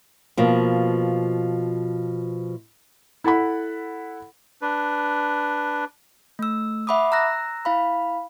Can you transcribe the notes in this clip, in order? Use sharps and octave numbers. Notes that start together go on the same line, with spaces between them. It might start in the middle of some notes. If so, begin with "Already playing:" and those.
B2 F3 A#3
E4 A4 F#5 B5
D4 B4
A3 E6
E5 F#5 B5 D6 D#6
A#5 E6 F#6 A#6
E4 F5 B5